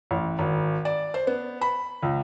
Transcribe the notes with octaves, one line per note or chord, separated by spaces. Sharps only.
A1
G#1
D5
C5
B3
B5
C#2